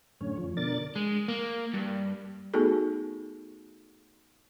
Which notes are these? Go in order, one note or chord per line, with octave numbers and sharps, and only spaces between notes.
F#2 A2 D3 C#4 C#5
F2 F3
B2 D3 A#4 D5 A6
G#3
A#3
G2
A3 B3 D#4 F#4 G#4 A4